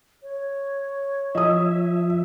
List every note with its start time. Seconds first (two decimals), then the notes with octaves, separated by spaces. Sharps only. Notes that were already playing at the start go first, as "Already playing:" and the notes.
0.23 C#5
1.35 F3 D#5 E5 D#6